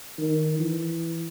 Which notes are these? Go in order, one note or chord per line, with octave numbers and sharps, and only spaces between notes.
D#3
E3